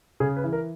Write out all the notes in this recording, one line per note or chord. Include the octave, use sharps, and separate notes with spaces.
C#3 G#4
B4
E3
A#4